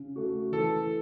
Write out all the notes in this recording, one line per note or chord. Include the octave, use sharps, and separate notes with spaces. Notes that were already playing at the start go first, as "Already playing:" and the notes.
Already playing: C#3
A3 F#4
E3 A4